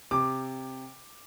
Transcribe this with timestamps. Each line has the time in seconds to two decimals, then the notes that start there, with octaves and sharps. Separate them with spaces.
0.11 C3 D6